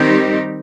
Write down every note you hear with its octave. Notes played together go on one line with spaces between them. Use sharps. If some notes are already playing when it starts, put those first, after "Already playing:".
Already playing: D#3 G3 C4 D#4 G4